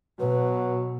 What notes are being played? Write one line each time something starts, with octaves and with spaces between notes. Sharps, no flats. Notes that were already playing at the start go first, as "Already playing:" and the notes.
B2 F#3 B4